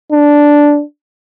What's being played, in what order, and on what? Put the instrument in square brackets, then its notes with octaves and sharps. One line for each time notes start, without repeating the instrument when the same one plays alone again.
[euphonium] D4